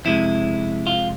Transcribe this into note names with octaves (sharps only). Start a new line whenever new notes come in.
F2 C3 G#3 E4
F4